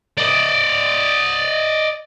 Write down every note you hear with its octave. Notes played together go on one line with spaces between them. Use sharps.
D5 D#5